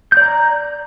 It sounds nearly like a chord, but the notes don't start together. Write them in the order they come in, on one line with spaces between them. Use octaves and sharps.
G6 D5 A#5